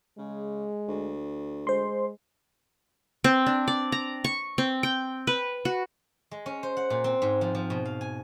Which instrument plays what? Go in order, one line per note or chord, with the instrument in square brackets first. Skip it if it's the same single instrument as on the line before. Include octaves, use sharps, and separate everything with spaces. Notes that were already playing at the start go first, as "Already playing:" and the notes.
[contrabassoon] C#3 [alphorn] G#3
[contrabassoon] D2
[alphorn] G#3 [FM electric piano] C5 C6
[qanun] C4
D4
D5
A#5
C#6
C4
G5
B4
F#4
[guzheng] G#3
C#4
C5
F#5
A#2
C4
G#2
F3
F3
B2
F5
G#5